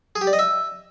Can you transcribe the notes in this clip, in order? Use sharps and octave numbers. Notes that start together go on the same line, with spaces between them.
G#4
G4
D5
D#5
E5